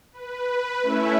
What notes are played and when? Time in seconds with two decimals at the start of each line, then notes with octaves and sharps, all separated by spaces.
0.12 B4
0.82 A3 C#4 E4 E5